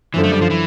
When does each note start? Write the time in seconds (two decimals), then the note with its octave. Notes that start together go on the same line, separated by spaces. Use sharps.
0.14 F#2 D3 E3 F3
0.24 A3
0.32 G3
0.41 F3
0.50 E3